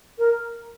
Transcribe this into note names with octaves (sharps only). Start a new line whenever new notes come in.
A#4